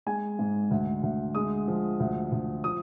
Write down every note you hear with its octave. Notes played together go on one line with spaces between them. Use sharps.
G#3 G#5
G#2
D2
D2
G#3 D#6
F3
D2
D2
F3 D#6